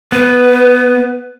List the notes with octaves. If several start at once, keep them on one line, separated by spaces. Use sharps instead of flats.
B3 B4